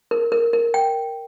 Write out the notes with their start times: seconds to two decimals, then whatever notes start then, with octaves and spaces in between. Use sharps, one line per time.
0.11 A#4
0.32 A#4
0.53 A#4
0.74 G5